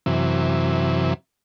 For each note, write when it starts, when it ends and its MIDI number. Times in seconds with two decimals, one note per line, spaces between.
0.06 1.14 42
0.06 1.14 48
0.06 1.14 52